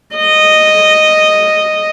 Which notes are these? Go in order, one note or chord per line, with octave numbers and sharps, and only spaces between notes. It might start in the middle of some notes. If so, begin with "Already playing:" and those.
D#5